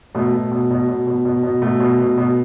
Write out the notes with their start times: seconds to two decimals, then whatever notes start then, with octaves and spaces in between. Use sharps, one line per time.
0.15 B2 A3
0.33 B2
0.51 B2
0.71 B2
0.88 B2
1.07 B2
1.25 B2
1.43 B2
1.62 B2 A3
1.80 B2
1.99 B2
2.17 B2